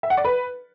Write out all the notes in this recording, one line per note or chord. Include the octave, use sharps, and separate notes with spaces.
E5
F#5
D5
B4